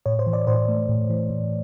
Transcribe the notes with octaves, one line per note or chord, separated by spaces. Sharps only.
A2 C#5
C5
E3
D5
A2 C5
A3
A2
E3
A2